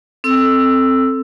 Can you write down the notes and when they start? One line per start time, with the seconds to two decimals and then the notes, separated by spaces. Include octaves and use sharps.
0.24 C4 A4 E6